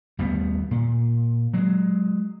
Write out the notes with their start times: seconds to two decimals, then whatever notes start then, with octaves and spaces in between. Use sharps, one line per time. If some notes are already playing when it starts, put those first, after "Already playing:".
0.19 D#2 G3 A3 B3
0.71 A#2
1.54 F#3 G#3